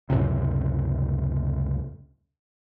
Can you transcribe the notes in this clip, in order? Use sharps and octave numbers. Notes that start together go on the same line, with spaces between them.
C#2 F#2 A2 C3